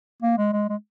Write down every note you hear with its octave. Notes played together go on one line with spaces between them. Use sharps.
A#3
G#3
G#3
G#3